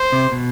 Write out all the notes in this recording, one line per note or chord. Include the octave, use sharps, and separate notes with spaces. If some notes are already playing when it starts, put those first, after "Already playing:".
Already playing: C5
C3
B2